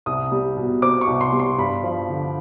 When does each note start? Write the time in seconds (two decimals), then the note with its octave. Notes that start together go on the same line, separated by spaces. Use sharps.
0.06 C2 D#6
0.31 G3
0.57 B2
0.82 C4 D6
1.01 C#6
1.07 C2
1.21 C6
1.32 G3
1.39 C6
1.58 G2 B5
1.83 F3
2.09 D3